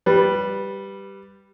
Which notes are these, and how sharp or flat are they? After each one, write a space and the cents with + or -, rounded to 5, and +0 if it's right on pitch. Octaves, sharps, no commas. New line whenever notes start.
G3 +0 B4 +0